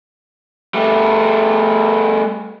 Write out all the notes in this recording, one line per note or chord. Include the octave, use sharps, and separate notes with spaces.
G3 A3